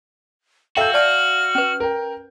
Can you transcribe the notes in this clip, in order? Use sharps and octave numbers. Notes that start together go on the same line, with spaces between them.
F#4 A4 E5 F5 G5 G6
D5 A5 F6
C#4 B4
A#4 G5